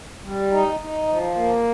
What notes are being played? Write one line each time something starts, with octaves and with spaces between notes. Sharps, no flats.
G3
D#4
D#4
F3
A#3